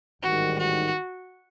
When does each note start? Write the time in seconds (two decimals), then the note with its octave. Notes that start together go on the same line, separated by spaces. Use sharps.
0.22 A1 G#2 D#3 G3 F#4
0.58 F#4